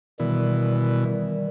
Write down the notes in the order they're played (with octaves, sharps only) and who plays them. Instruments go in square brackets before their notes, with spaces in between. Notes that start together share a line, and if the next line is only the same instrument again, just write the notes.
[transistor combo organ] B2 E3 [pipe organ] D#3 G3